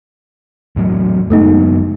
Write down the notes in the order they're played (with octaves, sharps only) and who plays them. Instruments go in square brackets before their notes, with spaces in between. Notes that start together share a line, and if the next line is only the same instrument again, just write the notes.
[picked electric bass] E2 A2 F#3
[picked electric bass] F#1 F#3 B3 [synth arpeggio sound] G#3 A3 D#4